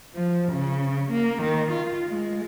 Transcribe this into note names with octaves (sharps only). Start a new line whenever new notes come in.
F3
C#3
A#3
D#3
F4
G#3